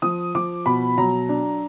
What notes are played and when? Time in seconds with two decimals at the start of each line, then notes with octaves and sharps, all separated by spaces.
0.02 F3 D#6
0.35 F3 D6
0.66 B2 B5
0.98 F#3 A#5
1.29 D4